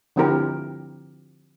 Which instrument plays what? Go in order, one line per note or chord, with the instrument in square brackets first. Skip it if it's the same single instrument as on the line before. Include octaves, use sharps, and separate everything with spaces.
[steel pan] D3 F3 C4 E4 G4 A#4